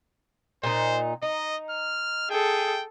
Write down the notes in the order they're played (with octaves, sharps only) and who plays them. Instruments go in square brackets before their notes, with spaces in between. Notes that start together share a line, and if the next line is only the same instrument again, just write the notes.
[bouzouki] A#2 D#4 [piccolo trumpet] C5
[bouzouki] D#4 [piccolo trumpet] D#5
[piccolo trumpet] F6
[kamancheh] G#4 A4 [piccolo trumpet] G5